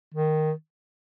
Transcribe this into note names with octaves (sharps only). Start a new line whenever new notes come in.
D#3